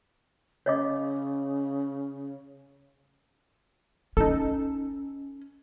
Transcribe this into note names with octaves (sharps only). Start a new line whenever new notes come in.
C#3 C#5 D#5 D6
C#4 D#4 A4